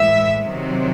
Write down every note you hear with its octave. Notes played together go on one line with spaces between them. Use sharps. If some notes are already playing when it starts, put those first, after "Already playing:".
Already playing: A2 E3 G#3 E5
C3 D#3 F#3 C4